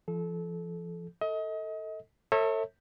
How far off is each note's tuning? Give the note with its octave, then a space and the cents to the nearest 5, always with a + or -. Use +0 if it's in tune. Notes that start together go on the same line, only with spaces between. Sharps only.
F3 -40 A4 -25
A4 +15 D#5 +30
A4 +35 C#5 -30 E5 -25